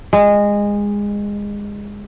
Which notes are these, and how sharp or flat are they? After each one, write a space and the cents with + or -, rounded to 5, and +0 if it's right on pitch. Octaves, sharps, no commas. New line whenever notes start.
G#3 -20